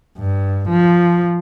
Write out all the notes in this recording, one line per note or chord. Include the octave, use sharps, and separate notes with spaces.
G2
F3